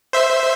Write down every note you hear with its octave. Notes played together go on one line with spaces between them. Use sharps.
C5 E5